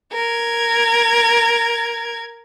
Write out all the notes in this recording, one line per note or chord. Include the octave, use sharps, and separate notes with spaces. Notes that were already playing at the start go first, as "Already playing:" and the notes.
A#4 G#6